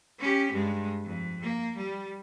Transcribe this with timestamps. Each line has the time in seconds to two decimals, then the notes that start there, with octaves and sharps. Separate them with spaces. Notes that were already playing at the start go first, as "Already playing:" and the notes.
0.19 C#4 G4
0.52 G2 G#3
1.05 F2
1.42 A#3
1.77 G3